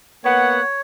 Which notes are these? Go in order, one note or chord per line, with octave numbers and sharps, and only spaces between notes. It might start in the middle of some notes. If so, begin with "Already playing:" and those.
A#3 B3 C#5 F#5